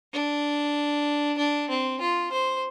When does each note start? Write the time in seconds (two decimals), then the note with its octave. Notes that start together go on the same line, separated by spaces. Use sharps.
0.13 D4
1.37 D4
1.69 C4
2.00 F4
2.32 C5